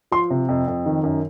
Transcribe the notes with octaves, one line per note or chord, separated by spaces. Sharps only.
F3 C6
C3
F2
F2
D#3
F#2